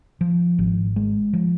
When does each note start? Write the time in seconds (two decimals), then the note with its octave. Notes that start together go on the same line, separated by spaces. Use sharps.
0.21 F3
0.59 G#1
0.96 G#3
1.33 F3